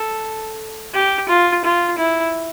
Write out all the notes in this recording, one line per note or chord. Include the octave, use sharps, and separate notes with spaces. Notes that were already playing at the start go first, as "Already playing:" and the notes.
Already playing: A4
G4
F4
F4
E4